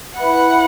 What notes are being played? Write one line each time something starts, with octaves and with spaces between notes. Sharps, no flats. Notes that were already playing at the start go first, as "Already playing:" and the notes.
E4 B4 E5 F#5 B5